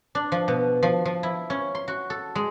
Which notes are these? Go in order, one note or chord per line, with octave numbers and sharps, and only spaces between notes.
D4
F3
B2
F3
F3
E4
C#4
C6
F#4
A4
G#3